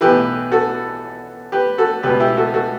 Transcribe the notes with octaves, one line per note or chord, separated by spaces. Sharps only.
B1 A2 E3 G4 B4
F#4 A4
G4 B4
F#4 A4
C#2 B2 G4 B4
E4 G4
F#4 A4
F#4 A4